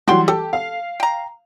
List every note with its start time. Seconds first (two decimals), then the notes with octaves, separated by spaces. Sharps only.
0.07 E3 F#3 G3 F#4 G5 C6
0.28 G4 A4
0.53 F5
1.00 G5 A#5